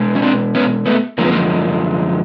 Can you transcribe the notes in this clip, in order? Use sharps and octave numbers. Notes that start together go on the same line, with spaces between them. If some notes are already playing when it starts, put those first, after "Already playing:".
Already playing: B2 G#3
C#4
C4 D4
B3 C#4
A3 B3
F#2 D3 F3 G#3 A#3
B3
A#3